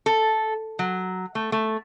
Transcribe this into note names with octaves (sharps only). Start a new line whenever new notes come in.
A4
F#3
A3
A3